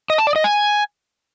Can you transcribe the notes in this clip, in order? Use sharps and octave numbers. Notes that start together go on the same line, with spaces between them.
D#5
A5
D5
D#5
G#5